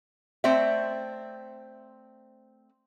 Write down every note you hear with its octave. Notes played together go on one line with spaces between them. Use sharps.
A3 C4 C5 D5 E5